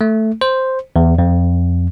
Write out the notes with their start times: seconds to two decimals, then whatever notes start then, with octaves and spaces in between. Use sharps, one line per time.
0.01 A3
0.41 C5
0.96 E2
1.19 F2